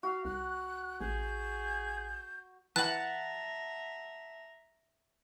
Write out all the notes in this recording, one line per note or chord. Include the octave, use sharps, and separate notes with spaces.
F#4 F5
C2 F#6
A1 G#4 G6
E3 E5 F#5 A5 A#5 F#6